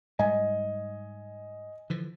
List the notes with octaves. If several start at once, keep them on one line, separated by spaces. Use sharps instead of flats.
G#2 G3 D#5 G#5
D3 E3 F3